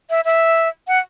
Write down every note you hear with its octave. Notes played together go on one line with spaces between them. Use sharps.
E5
E5
F#5